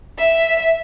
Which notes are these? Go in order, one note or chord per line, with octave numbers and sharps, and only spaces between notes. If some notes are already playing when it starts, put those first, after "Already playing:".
E5